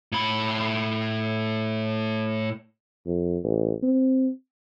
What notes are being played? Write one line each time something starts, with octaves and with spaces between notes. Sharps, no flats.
A2 B5
F2
A1
C4